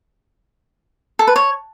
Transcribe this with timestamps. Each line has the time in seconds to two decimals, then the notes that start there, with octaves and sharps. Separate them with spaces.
1.19 A4
1.27 B4
1.36 C#5